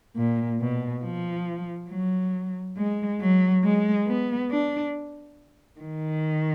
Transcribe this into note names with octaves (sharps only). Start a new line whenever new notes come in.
A#2
B2
F3
F#3
G#3
F#3
G#3
B3
D4
D#3